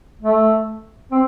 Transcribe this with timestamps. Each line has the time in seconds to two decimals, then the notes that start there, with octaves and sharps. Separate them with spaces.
0.22 A3
1.11 C4